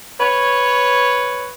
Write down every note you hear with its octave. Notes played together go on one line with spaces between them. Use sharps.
B4 C#5